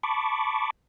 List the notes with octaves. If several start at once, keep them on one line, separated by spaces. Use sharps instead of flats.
A5 B5 C#6 D6